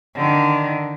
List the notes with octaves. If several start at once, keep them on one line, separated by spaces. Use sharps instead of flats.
D3 D#3